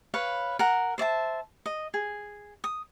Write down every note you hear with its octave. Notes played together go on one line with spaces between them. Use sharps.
B4 C#5 F5
A#4 F#5
C5 D5 E5 A5
D#5
G#4
D#6